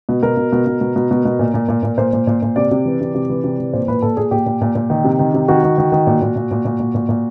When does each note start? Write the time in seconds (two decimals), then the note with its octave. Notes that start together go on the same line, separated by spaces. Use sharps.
0.09 B2
0.23 B2 A#4
0.37 B2
0.52 B2
0.67 B2
0.81 B2
0.96 B2
1.11 B2
1.25 B2
1.39 A#2
1.54 A#2
1.69 A#2
1.83 A#2
1.98 A#2 C5
2.13 A#2
2.27 A#2
2.42 A#2
2.56 C3 D5
2.71 C3
2.85 E3
3.01 C3
3.15 C3
3.29 E3
3.44 C3
3.59 E3
3.73 A#2 C5
3.88 A#2 B4
4.02 A#2 A4
4.17 A#2 G#4
4.31 A#2 G4
4.46 A#2
4.61 A#2
4.75 A#2
4.90 D#3
5.04 C3
5.19 D#3
5.34 C3
5.48 D#3 F#4
5.64 D#3
5.78 D#3
5.92 D#3
6.07 A#2
6.22 A#2
6.36 A#2
6.51 A#2
6.65 A#2
6.80 A#2
6.95 A#2
7.09 A#2